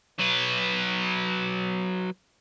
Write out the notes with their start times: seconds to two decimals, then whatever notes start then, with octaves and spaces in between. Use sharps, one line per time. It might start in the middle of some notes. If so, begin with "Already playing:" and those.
0.19 F#3 B4